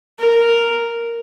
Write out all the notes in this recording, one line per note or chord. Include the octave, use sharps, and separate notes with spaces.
A#4